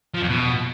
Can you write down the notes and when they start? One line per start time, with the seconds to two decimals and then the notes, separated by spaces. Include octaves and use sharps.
0.14 F3
0.21 F2
0.29 B2